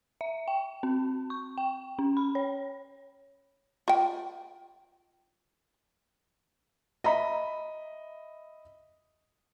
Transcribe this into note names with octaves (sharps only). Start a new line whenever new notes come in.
E5
G5
C4
C#6
G5
C#4
B5
C#5
F4 G5
D#5 E5 B5